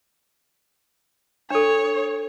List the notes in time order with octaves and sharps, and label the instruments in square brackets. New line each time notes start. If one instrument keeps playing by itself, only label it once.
[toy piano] D4 A4 [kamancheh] C#5